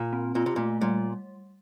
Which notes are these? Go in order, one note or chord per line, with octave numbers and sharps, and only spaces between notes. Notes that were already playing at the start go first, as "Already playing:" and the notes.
Already playing: A#2
C4
A#2 F4
C3
A#2 A3
A#2 G3